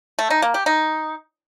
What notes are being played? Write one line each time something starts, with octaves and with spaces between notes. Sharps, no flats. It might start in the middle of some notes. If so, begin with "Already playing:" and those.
A3
D#4
A#3
G4
D#4